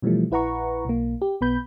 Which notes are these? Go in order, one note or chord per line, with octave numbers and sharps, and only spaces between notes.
B2 E3 F3 G3 A3
A#1 E4 B4 F#5 A#5 C#6
B1 A#3
G4
B1 B3 B5 G6